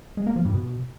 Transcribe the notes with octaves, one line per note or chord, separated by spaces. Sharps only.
G#3
A#3
F3
G2
B2